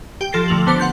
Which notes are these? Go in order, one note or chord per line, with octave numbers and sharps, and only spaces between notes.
G4 G5
F3 A4 A6 A#6 C7
D3 F3 A3 F7 F#7
D3 B3 C5 D6 A6 C#7
F#5 C6 G6 A6